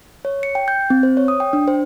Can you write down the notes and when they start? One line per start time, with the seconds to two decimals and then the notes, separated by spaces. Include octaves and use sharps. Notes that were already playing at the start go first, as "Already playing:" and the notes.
0.25 C#5
0.43 C#7
0.55 G5
0.68 G6
0.90 C4
1.03 C5
1.17 C#5
1.28 D#6
1.40 G5
1.53 D4
1.68 C5